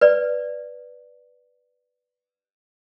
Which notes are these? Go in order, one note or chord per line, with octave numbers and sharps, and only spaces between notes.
B4 D5